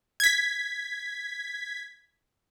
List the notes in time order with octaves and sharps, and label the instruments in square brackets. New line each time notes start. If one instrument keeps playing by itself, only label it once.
[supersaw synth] G#6 B6